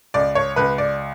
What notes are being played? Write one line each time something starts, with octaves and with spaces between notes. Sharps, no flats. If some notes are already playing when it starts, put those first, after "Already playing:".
C#2 D5
C#5
C#2 B4
D5